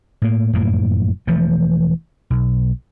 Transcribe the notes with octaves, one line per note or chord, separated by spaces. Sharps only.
A2 A#3
F1 F#2 A2 A#3
E1 E3 F3 A3
B1